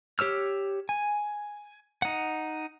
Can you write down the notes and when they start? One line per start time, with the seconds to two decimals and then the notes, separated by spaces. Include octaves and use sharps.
0.19 G4 C#5 E6 F6
0.89 G#5
2.02 D#4 F#5